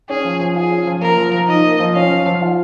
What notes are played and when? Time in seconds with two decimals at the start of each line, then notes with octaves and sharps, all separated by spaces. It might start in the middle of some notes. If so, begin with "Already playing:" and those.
0.09 C#4 G#4
0.25 F3
0.40 F3
0.56 F4 G#4
0.71 C#4
0.87 F3
1.02 A#3 A#4
1.18 F3
1.33 F3
1.48 D#4 D#5
1.64 A#3
1.80 F3
1.96 C#4 F5
2.10 F3
2.26 F3
2.41 F4